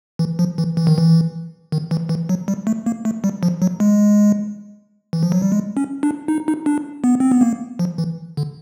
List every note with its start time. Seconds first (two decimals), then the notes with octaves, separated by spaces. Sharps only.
0.19 E3
0.39 F3
0.58 E3
0.77 E3
0.87 D#3
0.98 E3
1.72 D#3
1.91 E3
2.09 E3
2.29 F#3
2.48 G3
2.67 A3
2.86 A#3
3.05 A3
3.24 G3
3.43 F3
3.62 F#3
3.80 G#3
5.13 E3
5.23 F3
5.32 F#3
5.42 G3
5.52 G#3
5.77 C#4
6.03 D4
6.28 D#4
6.48 D#4
6.66 D4
7.04 B3
7.20 C4
7.31 B3
7.41 A#3
7.79 F3
7.98 E3
8.37 D3